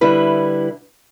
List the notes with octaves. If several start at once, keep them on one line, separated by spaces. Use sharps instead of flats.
D3 G3 E4 B4